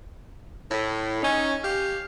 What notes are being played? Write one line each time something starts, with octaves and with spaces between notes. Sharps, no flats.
A2
C#4 D#4
G4 F5